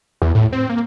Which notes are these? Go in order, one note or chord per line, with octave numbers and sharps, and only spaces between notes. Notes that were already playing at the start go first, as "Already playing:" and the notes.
E2
A2
C4
A#3